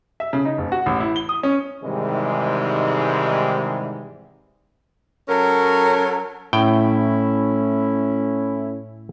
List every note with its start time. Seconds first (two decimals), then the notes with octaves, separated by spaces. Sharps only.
0.20 E5
0.33 C#3
0.45 D#4
0.58 F#1
0.72 F#4
0.86 A1
1.00 E4
1.16 G7
1.29 D#6
1.43 C#4
1.83 G#2 C3 D#3 E3 G3 G#3
5.29 F#3 C#4 A4 A#4
6.53 A2 A3 C#4 E4 G5